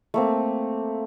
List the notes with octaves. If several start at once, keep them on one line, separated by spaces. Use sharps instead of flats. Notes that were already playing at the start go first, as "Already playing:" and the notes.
A3 A#3 C4